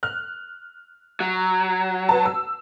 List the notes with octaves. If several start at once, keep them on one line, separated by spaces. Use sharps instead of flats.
F6 F#6
F#3
B4 A5
E6